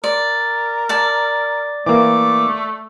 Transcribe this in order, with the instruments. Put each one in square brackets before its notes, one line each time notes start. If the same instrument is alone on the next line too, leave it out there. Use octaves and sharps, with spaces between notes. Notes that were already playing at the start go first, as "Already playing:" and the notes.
[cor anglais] A#4 [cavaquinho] D5
[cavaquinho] D5 A5
[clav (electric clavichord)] E3 A#3 [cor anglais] A3 [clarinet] D6